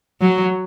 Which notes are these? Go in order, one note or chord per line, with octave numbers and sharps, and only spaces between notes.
F#3